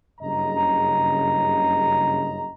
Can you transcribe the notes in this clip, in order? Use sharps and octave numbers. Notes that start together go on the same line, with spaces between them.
F#1 G2 C#3 D#5 A#5